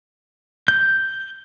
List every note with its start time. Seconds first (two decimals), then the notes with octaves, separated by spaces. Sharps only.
0.68 G6